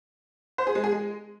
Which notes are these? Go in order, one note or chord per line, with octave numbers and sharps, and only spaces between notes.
C5
G#4
G#3
G#4
G#3